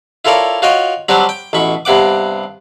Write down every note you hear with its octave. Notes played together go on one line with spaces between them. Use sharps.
E4 F4 A4 A#4 C#5 D5
F4 F#4 C#5 D#5 G5
F#3 G3 C4 D4 F#4 G4
G5
A1 B2 B5 C#6
G2 C3 B3 F#5 D6